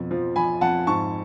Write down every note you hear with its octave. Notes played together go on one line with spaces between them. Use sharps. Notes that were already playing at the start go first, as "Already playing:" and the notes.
Already playing: F2 B2
F3
F3 G#5 B5
F2 F#5 A5
G#2 A5 C#6